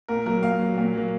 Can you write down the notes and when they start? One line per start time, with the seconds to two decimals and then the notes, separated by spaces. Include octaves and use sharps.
0.08 A#2 A#4
0.26 F#3 A#3 A#4
0.42 A#2 F5
0.59 F#3 A#3
0.77 A#2
0.94 F#3 A#3